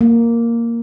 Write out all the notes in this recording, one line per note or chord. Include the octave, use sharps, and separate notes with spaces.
A#3